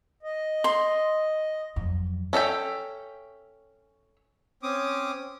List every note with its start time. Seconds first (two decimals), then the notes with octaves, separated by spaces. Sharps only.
0.23 D#5
0.64 C6
1.76 F2 F#3
2.33 C#4 A4 E5 G5
4.63 C4 C#4 D6 D#6